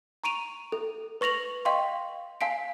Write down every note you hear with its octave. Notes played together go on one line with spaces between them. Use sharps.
A#5 C#6 D7 D#7 F7
A4
B4 C#6 A#6 F7 F#7
D#5 F5 G5 C6 C#6
F5 G#5 A5 B6 C7 D7